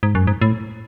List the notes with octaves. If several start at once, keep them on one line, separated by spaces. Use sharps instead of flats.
G#2
F#2
G#2
A2